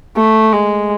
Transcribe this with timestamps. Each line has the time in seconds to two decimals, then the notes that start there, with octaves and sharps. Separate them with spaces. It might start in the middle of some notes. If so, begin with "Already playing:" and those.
0.16 A3
0.52 G#3